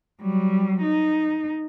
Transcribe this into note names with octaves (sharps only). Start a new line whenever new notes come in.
F#3 G3
D#4